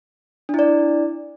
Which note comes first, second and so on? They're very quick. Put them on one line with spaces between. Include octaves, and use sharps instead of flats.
D4 E4 D5